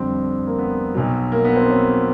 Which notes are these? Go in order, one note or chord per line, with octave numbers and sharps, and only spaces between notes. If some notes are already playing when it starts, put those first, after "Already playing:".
Already playing: F2 D3 G3 C4
A#3
B3
B1 B2 F#3
A#3
B3
C4
C#4